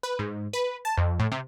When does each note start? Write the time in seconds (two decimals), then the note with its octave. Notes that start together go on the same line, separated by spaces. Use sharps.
0.03 B4
0.19 G#2
0.53 B4
0.85 A5
0.97 F2
1.19 A2
1.32 C3